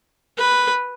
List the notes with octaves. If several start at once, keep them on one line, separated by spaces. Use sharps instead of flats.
B4